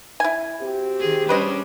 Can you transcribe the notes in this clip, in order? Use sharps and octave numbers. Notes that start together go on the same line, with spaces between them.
E4 G#5
C4 F#4 G4
D#3 G#4
G3 C#4 D4 B4 C5 D#5